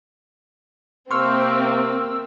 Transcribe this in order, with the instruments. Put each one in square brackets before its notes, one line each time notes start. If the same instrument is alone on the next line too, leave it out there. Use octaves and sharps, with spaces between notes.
[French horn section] C3 A#3 [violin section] C4 [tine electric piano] C6 C#6 F6 [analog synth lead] E6